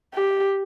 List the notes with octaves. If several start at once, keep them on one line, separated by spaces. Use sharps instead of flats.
G4